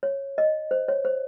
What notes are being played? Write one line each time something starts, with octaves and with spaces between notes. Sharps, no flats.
C#5
D#5
C5
C#5
C5